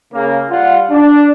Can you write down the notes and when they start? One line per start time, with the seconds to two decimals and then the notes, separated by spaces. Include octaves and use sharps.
0.13 C#3 A#3
0.51 G3 F4 F#5
0.91 D4